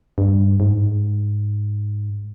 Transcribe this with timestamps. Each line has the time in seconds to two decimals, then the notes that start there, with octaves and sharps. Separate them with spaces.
0.18 G2
0.60 G#2